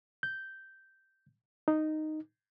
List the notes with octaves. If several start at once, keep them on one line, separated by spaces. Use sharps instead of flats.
G6
D#4